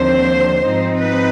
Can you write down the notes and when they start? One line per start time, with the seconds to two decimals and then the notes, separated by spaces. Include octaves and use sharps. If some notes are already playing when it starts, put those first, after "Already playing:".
Already playing: D#2 D3 F3 C4 C5
0.67 G#2 F3 C4 D#4
0.99 B4